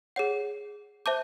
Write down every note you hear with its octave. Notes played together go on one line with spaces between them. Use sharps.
G#4 C#5 F#5
C5 E5 A5 D6 G6